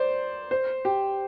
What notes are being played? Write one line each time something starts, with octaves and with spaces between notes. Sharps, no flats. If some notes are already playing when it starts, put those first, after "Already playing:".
Already playing: C5 D5
C5
G4